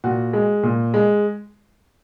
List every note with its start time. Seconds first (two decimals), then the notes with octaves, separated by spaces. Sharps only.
0.04 A#2 F#4
0.33 G#3
0.63 A#2
0.94 G#3